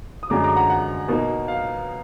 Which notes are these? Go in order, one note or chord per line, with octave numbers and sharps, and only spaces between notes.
D#6
F#2 D3 G#3 D4 A#5 D6
A#5 D6
F#5 A#5
F#5
B2 A#3 D#4
F5